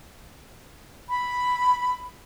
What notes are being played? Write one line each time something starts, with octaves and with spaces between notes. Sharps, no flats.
B5